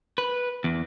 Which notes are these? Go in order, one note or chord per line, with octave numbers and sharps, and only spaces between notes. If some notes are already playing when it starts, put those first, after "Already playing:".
B4
E2